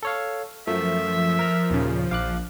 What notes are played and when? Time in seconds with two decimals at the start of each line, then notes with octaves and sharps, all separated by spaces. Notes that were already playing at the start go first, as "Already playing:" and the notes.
0.03 A4 C#5 F5
0.67 F#2 F3 A3 E5
1.39 A#4 A#5
1.70 D#2 A#2 C#3
2.11 A#1 F5 D6 F#6